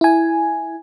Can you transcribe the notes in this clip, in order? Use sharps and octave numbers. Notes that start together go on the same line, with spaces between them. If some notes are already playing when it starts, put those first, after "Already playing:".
E4 G#5